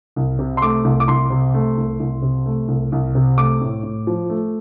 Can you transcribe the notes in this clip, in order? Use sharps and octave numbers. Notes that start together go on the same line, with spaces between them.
C2
C3
C6
A3 D6
C2
D6
C2 C6
C3
A3
C2
C2
C3
A3
C2
C2
C3
A3 D6
A2
A2
F3
A3